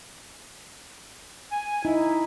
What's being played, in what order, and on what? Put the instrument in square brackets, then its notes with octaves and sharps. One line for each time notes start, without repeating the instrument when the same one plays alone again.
[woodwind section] G#5
[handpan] D#4 [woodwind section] E4